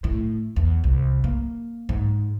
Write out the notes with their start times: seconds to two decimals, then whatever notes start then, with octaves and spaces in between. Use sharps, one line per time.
0.04 A2
0.56 E2
0.84 C2
1.24 A#3
1.89 G#2